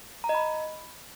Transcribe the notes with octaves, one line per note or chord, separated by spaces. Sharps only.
A#5
D#5
B5